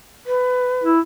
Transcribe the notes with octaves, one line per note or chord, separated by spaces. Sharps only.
B4
E4